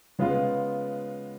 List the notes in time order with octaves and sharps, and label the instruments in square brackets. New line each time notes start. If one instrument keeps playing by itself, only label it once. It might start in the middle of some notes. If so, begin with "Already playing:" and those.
[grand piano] C#3 G#3 B3 F4